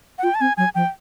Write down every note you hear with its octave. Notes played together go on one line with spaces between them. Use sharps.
F#5
F4 G5
A5
C4 G#5
F#3 G#5
F3 G5